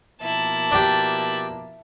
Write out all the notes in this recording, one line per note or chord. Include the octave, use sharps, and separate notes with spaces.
B2 F3 A#3 E4 A5
D4 G4